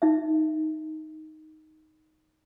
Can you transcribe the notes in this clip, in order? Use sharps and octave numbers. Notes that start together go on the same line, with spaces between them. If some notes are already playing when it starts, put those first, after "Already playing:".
D#4 E5